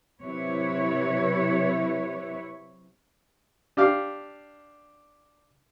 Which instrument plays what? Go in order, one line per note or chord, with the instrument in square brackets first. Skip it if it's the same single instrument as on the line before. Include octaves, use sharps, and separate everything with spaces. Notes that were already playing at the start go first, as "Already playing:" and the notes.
[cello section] C3 F#3 E4 B4 C#5
[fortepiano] D4 G4 F5